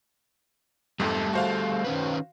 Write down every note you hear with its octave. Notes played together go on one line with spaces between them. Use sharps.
F2 G#2 G3 A3 A4
F#4 C5 F5
D#3 C#4 B4